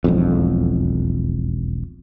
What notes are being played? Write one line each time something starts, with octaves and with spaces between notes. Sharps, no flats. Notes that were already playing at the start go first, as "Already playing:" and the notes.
E1 B1 F2